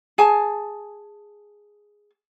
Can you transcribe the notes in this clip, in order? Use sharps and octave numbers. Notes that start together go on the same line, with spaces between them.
G#4 G#5 A5